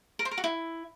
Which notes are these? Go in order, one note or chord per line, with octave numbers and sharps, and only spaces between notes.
A#4
C5
A#4
F#4
E4